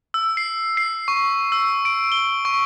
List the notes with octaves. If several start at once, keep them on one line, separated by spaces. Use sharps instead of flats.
E6
C7
C7
C#6
E6
D7
G7
C#6